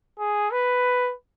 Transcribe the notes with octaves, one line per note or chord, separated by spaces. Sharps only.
G#4
B4